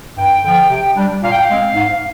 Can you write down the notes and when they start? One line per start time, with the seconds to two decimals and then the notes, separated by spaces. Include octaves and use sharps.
0.18 G2 G5
0.45 D3 F3
0.70 C3
0.96 G3 D4
1.23 A#2 F5
1.32 G5
1.40 F5
1.49 G#3 C4
1.75 G#2